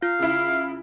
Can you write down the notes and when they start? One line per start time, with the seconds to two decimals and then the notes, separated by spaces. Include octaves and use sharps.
0.02 F4 F5
0.19 C#3 E4